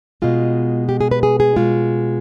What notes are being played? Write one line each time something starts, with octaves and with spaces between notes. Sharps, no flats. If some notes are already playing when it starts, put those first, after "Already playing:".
B2 G#3 F4
G4
G#4
B4
G#4
G#4
B2 G#3 F4